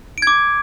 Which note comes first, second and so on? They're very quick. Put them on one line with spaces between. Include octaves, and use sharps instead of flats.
D7 G#6 D6